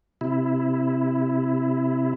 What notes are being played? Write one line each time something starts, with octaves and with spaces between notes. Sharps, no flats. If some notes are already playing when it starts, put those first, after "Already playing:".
C3 E4